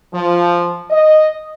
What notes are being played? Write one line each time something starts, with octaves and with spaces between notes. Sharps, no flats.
F3
D#5